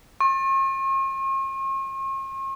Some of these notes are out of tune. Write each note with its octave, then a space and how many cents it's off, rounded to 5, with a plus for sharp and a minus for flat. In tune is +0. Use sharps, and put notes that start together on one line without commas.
C#6 -45